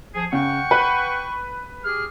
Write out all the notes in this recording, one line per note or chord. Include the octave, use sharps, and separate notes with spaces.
F3 G#4
C#3 F#5 G5 C#6
B4
G4 G#4 F6